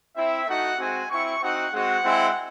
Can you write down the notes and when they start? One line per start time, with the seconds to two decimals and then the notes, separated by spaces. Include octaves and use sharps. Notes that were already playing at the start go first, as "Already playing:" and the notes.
0.16 C4 E4 E5
0.47 A3 D#4 F#4 F#5
0.78 G#3 C4 F#4 G#5
1.10 C4 E4 C#6
1.41 C4 D#4 F#4 F#5
1.73 G#3 C4 F#4 F#5
2.04 G#3 C4 E4